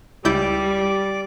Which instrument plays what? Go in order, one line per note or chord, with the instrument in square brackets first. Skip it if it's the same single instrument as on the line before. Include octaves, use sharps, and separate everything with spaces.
[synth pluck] C#2 E4 G6 [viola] G3 [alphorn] G4 [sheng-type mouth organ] D5 D6